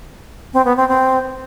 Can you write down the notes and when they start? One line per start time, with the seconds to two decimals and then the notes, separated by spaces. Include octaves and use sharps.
0.53 C4
0.65 B3
0.77 C4
0.89 C4